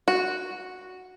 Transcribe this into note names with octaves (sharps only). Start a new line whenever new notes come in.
F#4